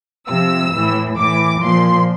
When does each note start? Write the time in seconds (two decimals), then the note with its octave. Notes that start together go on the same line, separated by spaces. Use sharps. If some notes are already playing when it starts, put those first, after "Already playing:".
0.29 C3 F3 E6
0.74 A2 E3
1.18 A2 E3 D6
1.62 A#2 F3 C6